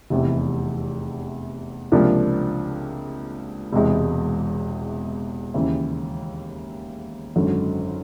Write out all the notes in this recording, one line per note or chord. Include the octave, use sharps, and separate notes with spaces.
F1 E2 C3 E3
C#2 C3 F3 A#3 D4
E1 E2 C3 E3 G#3
D#2 C#3 E3
G#1 F#2 D3 F#3